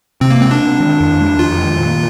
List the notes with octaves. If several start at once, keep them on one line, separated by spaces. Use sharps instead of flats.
C3 C4
A#3
G#3 C4
D4
C4
D#3
F2
G#3
F2 F4
D#3
A#2